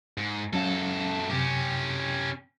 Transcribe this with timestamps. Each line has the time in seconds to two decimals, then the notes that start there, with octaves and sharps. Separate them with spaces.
0.18 G#2
0.53 F#2 F#3 C#4 A4 F5
1.30 F#2 C3 C#4 G4